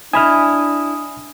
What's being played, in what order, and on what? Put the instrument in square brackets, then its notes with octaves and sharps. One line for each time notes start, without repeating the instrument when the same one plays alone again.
[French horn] D4 [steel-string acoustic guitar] E4 D#5 [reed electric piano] G#5 B5 F6 [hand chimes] D#6